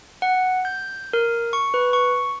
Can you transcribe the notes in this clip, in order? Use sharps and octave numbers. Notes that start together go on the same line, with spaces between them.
F#5
G6
A#4
C#6
B4
C#6